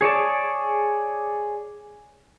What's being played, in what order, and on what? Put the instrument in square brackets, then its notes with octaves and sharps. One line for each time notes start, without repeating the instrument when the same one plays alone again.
[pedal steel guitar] G#4 C#5 D5 A5